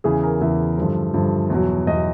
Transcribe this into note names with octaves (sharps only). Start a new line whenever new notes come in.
E2 C#3 E3 G#4
A#4
E2 C#3 E3 E5
G2 D3 F3
G2 D3 F3
E2 B2 F#3
E2 B2 F#3 D#5